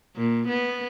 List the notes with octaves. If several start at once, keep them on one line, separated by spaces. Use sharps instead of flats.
A#2
B3